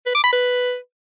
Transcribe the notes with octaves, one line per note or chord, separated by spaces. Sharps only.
B4
D6
B5
B4